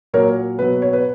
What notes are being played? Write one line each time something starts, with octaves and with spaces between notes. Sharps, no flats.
A#2 F#3 A#4 C#5
B2 F#3 B4
C#5
B4